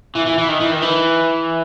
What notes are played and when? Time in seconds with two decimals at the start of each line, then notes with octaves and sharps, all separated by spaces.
0.15 E3
0.26 E3
0.38 E3
0.49 D#3
0.60 E3
0.72 D#3
0.82 E3